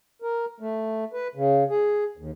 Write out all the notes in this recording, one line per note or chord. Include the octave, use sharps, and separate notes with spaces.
A#4
A3
B4
C#3
G#4
D#2